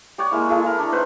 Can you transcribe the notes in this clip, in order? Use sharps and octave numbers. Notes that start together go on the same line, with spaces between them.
G4 C#5 D5 F#5
G#3 A#3 E4
E4 G#4 A4
A#4 B5
D4
D#4 B4 C5 F#5